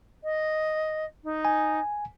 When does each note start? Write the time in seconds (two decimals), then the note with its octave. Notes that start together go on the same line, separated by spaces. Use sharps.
0.24 D#5
1.24 D#4
1.45 G#5